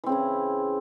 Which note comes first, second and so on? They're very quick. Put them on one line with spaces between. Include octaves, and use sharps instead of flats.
E3 C4 C#3 E4